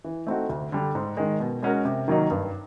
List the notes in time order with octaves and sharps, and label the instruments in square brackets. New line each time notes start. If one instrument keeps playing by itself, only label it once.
[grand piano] E3
A3 C4 D#4 F#4
D2
D3 G3
G#2
D#3 G#3
B2
G#3 C#4 F#4 A#4
C3
D#3 F#3 A#3 D#4
G2